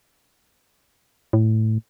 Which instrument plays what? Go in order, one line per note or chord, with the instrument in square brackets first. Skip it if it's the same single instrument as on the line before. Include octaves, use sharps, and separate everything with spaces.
[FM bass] A2